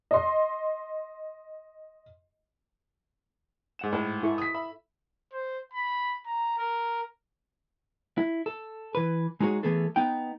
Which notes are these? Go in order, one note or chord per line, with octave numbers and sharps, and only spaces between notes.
D#5 C6
G#2 F#5 E7
A2
E4 A4 C#6
D#6 B6
E5 B5
C5
B5
A#5
A#4
E4
A4
E3 B4
G#3 D#4 F#4 G#4 C#5
E3 A3 B3 G#4 A4
B3 D#4 G5